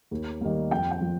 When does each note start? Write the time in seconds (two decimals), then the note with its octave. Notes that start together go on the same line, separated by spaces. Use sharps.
0.11 D#2
0.41 D#3 G3 A#3
0.71 F2 G5
0.91 G5
1.01 F3